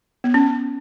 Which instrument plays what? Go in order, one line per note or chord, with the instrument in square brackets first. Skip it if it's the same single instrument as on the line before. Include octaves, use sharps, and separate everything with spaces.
[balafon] B3
C#4